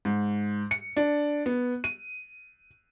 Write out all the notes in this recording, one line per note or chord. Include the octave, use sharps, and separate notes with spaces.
G#2
C#7
D4
B3
D#7